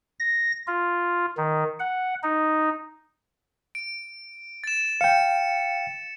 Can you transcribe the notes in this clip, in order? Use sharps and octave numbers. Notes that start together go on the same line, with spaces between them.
A#6
F4
D#3
F#5
D#4
D7
A6 E7
F5 G5 C#7